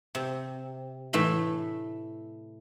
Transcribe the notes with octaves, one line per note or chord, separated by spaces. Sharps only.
C3
A2 E3 A3 E5